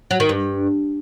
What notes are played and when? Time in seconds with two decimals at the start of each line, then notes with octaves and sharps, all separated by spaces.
0.11 F#3
0.20 D#3
0.29 G2